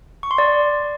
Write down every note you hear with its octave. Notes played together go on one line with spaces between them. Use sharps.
C#6
C6
D5